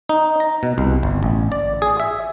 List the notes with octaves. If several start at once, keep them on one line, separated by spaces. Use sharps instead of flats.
D#4
A#5
B2
C2
G1
A1
D5
G#4
E5